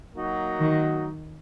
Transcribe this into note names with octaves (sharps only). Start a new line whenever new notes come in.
F#3 A#3 D#4 F#4
D#3